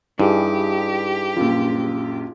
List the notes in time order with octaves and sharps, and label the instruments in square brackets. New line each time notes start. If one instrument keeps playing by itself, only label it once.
[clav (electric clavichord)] G2 [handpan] D#4 E4 G#4 [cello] G4
[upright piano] A#1 F#2 [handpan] F4